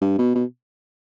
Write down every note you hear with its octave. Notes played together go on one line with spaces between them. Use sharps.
G2
B2
B2